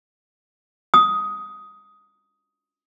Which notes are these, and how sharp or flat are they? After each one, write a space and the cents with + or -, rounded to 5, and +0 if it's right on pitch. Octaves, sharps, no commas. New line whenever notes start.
D#6 +10